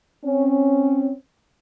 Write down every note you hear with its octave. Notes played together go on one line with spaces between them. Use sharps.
C4 C#4